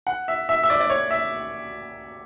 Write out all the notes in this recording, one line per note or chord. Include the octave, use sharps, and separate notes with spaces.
F#5
E5
E5
E5
D5
D5
C#5
E5